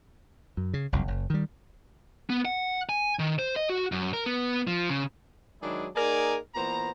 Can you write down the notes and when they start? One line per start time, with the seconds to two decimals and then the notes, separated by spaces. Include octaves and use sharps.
0.57 F#2
0.74 C#3
0.92 F#1 C2 F2
1.08 F#1
1.30 D#3 G3
2.30 B3
2.45 F#5
2.89 G#5
3.19 D#3
3.39 C5
3.56 D#5
3.70 F#4
3.92 F#2
4.13 A#4
4.26 B3
4.67 F3
4.90 C#3
5.62 D#3 F#3 G#3 D4 E4 G#4
5.96 A#3 D#4 G#4 A#4 D5 G#5
6.55 A#2 E3 B3 C5 A#5